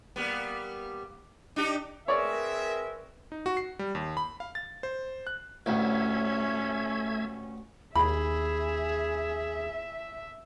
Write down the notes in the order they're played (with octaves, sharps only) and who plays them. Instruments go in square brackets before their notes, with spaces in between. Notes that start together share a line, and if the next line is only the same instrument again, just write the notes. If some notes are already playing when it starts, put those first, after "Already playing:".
[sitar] G3 A#3 B3
D4 D#4 G4
[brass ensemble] C4 G#4 E5 [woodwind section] A#4 B4 [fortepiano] C#5 D5
[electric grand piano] D#4
F#4
C7
G3
D#2
B5
F5
A6
C5
F#6
[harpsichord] A1 D2 [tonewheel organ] A3 E5 G#6 [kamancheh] C#4
[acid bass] D#2 [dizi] G#4 [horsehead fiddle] E5 [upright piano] B5